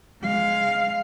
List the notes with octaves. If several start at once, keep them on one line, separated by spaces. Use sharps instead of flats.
G#3 F5